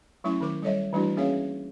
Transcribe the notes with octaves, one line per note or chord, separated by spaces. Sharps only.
F#3 A3 C#4 E4 E5 C#6
D#3 F#3 A#4 C5 D6
G3 A4 C#5 D#5 E5
E3 G3 A3 D4 E4 F#4
A#3 C#4 G#4 C#5 E5 F5